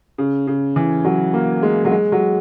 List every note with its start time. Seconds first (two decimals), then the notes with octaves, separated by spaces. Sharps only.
0.18 C#3
0.47 C#3
0.76 E3
1.05 F#3
1.34 A#3
1.63 G#3
1.85 F#3
1.91 G#3
2.12 F#3